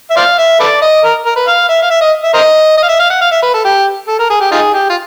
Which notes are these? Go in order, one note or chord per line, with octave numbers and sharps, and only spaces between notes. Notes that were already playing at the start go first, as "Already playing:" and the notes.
E5
C5 D5 F5
E5
A4 B4 D5
D#5
A#4
A#4
B4
F5
E5
F5
E5
D#5
E5
A#4 C5 D#5
D#5
F5
E5
F5
F#5
F5
E5
B4
A4
G4
A4
A#4
G#4
G4
D#4 F4 G#4
G4
F4